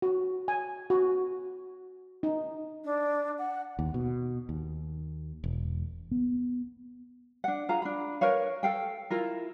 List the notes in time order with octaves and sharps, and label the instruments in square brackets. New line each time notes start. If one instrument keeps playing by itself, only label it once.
[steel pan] F#4
G#5
F#4
D#4
[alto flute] D4
F#5
[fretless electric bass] D#2
B2
D#2
E1
[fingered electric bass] B3
[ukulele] D4 F#5
F4 G#4 F5 A#5
D4 B5
A#4 B4 C#5 F5
A4 F5 G5
E4 F4 A#4